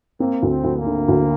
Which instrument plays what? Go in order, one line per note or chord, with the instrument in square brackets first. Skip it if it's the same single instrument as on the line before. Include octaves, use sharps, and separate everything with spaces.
[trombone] A#3 [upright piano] C4
[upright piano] D2
[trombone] C4
[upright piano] D2
[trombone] A#3
[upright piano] D3
D2